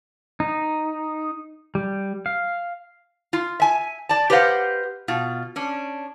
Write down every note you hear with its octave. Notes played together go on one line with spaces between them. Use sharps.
D#4
G3
F5
F4
E5 G#5
D5 A5
G4 B4 C5 D#5 F5 F#5
B2 F4
C#4 D4